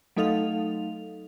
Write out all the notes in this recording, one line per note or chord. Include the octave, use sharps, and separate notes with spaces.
F#3 A3 D#4 A4 F5 F7